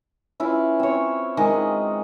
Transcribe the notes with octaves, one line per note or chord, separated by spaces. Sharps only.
C#4 E4 F4 B4
C4 C#5
D#3 G#3 D#5